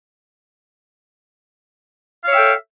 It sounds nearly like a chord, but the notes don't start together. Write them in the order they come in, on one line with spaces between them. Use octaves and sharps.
F5 C#5 E5 G5 A4